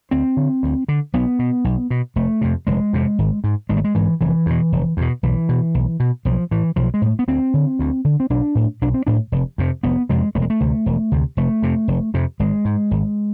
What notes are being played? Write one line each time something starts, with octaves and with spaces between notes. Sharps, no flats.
D2 C4
D3
D2
D3
B1 B3
B2
B1
B2
F1 A3
F2 C3
F1 G#3
F2 C3
G#1
G#2
G#1 G#3
A3
G#3
G#2 E3
F1 E3
E2 B2
F1
E2 B2
B1 E3
B2
B1
B2
B1 F3
A2 E3
B1 F3
G#3
A2
B3
D2 C4
D3
D2
D3
C4
B1 D4
A2
B1 D4
C4
A2 D4
F1
F2 C3
F1 B3
F2 C3 G#3
E1 A3
G#3
A3
D2 C3
E1
D2 C3
F1 A3
F2 C3
F1
F2 C3
G#1 G#3
G#2
G#1